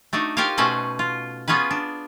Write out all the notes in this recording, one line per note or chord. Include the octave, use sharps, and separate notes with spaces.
A3 D4 D#4 F#4
F4 G4 A#4 C5 C#5 F5
B2 A3 C#4 B4 C5 F#5
F4
B3 C#4 F4 G#4 B4
D4